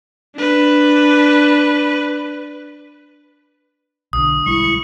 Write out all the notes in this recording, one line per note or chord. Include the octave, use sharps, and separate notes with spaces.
D4 B4
B1 D3 D#6
B1 G3 G#3 E4 C#6